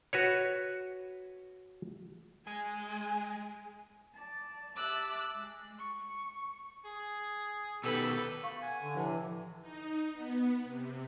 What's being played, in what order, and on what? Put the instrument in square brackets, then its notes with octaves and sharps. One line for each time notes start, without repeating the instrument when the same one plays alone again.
[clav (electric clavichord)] F#4 B4 C#5
[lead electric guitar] G#3 [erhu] G#5
[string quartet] D5 A5
G4 E5 A5 D6 E6 F#6
G#3
C#6
[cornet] G#4
[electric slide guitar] B2 D#3 [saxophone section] G4 A4 [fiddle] B4
[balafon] F5 C#6
[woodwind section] F#5 G#5
[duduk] D3
[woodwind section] A2 C3 [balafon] F3 B4 A5
[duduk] E3
[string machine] D#4
B3
C3